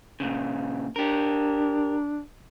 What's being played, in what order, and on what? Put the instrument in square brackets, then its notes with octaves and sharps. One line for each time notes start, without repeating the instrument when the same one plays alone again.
[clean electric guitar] A#2 C#3
[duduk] D4 [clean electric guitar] G4 A#4